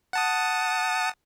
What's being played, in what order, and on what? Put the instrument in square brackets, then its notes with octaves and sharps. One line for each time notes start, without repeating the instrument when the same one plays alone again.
[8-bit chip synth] F#5 A5 D#6